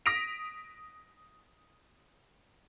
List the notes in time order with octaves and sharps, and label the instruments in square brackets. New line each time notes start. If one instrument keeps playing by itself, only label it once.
[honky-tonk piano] D#6 A#6 B6 D7 F7